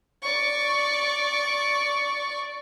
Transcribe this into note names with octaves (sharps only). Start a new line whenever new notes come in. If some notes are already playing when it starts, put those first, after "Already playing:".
D5 C#6